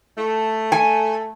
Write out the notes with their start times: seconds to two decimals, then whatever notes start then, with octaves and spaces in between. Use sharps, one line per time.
0.18 A3
0.72 G#5